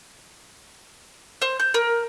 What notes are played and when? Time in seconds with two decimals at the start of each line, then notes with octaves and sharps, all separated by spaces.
1.42 C5
1.60 G6
1.74 A#4